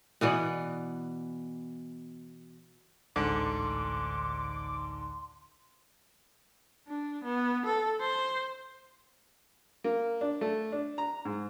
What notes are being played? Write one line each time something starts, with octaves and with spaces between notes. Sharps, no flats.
B2 E3 B3 D5
A1 D2 G#2 D3 C6 D6
D4
B3
A4
C5
A#3
D4
A3
D4
A#5
G#2